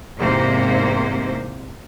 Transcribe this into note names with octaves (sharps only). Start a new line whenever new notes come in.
E2 G#2 C3 A#3 C5